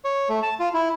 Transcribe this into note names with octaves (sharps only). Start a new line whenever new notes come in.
C#5
A3
A5
F4
E4